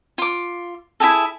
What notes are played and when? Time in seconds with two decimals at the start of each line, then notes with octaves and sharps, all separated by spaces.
0.18 F4 D6
1.00 E4 F#4 G#4 A4